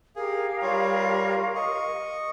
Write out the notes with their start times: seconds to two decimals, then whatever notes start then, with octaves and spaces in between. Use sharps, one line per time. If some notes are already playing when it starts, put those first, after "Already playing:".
0.16 G4 G#4 A#4 F5
0.62 G3 F4 C#5
1.55 D#5 C#6